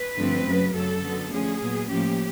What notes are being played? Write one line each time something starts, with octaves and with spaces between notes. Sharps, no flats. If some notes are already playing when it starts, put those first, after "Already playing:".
Already playing: B4
G2 D3 F3 A3 C4
F#2 C#3 F#3 A3
F#2 C#3 F#3 A4
D3 F#3 B3
D3 F3 A3 C#4 G#4
A#2 F#3 B3
A2 F3 A#3 C#4 G4